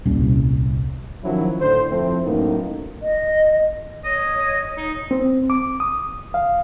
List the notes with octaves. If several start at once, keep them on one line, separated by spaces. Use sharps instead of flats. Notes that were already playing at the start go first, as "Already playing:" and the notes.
D#1 C2 C#4
D#3 F3 F#3 C#4 E4
A2 D3 C5
F2 F3 A3 C4 E4
F#2 A2 A#3 B3 D#4
D#5
C#5 D#5
D#4
C4
D6
D#6
F5